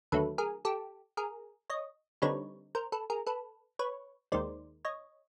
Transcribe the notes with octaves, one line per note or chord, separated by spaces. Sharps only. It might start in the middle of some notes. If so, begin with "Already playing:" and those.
D#2 D3 F#3 A3 A4 B4
G#4 A#4
G4 A4
G#4 A#4
C#5 D#5
D3 G3 C4 D#4 B4 C#5
A#4 C5
A4 B4
G#4 A#4
A4 B4
B4 C#5
D#2 D#3 G#3 C5 D5
C#5 D#5